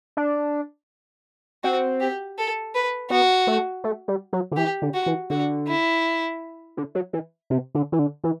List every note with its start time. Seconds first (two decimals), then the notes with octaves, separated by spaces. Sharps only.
0.17 D4
1.64 C4 F#4
2.01 G4
2.38 A4
2.74 B4
3.10 B3 F#4
3.47 A3
3.84 A3
4.08 G3
4.33 F#3
4.51 D3
4.57 E3 G4
4.82 D3
4.94 F#4
5.06 E3
5.30 D3 F#4
5.67 E4
6.77 D3
6.95 F#3
7.13 E3
7.50 C3
7.75 D3
7.92 E3
7.99 D3
8.24 E3